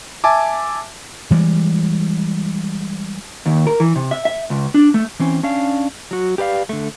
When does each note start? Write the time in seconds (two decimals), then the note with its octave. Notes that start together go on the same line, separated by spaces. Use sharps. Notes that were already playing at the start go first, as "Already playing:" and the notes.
0.24 E5 G#5 A5 D6
1.31 E3 G3 G#3
3.46 D#2
3.67 A#4
3.80 E3
3.96 C3
4.11 E5
4.25 E5
4.50 C#2
4.74 D4
4.94 A3
5.19 E3 C4 C#4
5.43 C#4 D4 F5
6.11 F#3 F#4
6.38 G4 B4 D5 F5
6.69 D3 A3